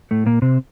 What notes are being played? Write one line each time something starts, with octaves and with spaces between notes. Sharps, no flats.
A2 A3
A#2 A#3
C3 C4